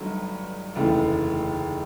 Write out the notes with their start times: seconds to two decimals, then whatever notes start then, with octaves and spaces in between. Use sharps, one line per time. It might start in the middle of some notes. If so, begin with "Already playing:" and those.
Already playing: G1 G2 D#3 F#3 A3
0.75 F1 D#2 C#3 E3 A3